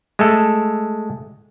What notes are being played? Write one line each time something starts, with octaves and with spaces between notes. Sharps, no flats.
G#3 A3 A4